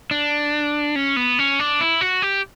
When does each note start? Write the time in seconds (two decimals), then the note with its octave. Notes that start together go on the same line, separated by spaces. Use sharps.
0.11 D4
0.96 C#4
1.16 B3
1.39 C#4
1.59 D4
1.81 E4
2.01 F#4
2.22 G4